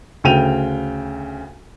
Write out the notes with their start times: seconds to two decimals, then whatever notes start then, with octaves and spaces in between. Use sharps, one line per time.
0.24 D2 C#3 G5 D#7 F7